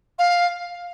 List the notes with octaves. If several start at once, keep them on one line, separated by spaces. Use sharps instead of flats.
F5